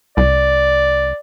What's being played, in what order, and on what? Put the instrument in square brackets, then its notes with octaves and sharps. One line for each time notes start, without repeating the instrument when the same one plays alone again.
[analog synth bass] C2 [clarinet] D5